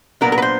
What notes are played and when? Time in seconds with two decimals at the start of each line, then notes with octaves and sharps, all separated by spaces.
0.21 A#2 F#3 B3 D4 A#4
0.32 A#4
0.38 B4
0.42 C5